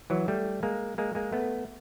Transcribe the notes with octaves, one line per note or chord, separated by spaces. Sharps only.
E3 F#3
G3 A3
G#3 A#3
G#3 A#3
G#3 A#3
A3 B3